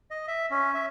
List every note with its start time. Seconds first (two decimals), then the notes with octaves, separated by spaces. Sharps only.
0.11 D#5
0.28 E5
0.51 C#4
0.74 E5